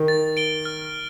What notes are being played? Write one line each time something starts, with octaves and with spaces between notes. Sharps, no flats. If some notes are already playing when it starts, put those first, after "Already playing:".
Already playing: D#3
A6
D7 G7
F6